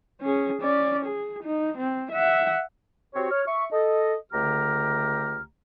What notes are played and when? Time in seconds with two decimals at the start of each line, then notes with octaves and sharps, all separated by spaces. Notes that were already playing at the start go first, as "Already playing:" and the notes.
0.21 C#4 G#4
0.61 C#4 D5
1.05 G#4
1.43 D#4
1.77 C4
2.11 E5 F#5
3.15 C4 F#4 G4 C#5
3.32 C#5 F6
3.48 E5 C#6
3.73 A4 D#5
4.33 C#2 D3 A3 G4 A#5 F6